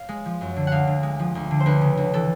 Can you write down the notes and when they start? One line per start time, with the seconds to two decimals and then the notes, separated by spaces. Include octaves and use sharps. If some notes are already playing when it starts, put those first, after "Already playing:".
Already playing: F5
0.09 G#3
0.25 F3
0.41 F#2
0.56 D3
0.67 D2 F5 F#5
0.87 D3
1.03 G#3
1.19 F3
1.35 D2
1.51 D3
1.60 C5
1.66 D2 B4
1.81 C#3
1.97 D2
2.14 E3 A4